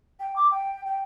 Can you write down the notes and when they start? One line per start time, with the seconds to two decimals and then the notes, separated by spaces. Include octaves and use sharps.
0.20 G5
0.36 D6
0.51 G5
0.86 G5